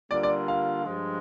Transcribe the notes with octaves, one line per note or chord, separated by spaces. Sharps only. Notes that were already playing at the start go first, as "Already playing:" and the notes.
D3 G3 A#3 F4 D5
D5
F5
G2 F3 G#3